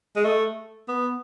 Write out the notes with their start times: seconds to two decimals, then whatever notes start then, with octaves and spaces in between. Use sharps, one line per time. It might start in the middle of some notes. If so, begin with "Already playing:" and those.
0.16 G#3
0.25 A3
0.89 B3